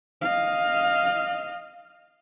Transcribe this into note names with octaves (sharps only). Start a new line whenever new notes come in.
D#5 F5